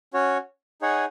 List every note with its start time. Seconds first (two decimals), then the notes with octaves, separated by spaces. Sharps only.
0.13 C#4 F#4 C#5
0.82 D#4 G#4 C#5 F#5